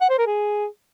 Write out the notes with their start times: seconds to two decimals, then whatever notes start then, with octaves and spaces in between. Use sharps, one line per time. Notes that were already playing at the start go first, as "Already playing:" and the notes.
0.01 F#5
0.10 C5
0.18 A#4
0.27 G#4